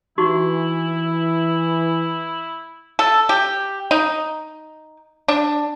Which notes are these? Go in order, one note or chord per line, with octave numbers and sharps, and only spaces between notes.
E3 D#4 E4 F#4 C#6
A4
G4
D#4
D4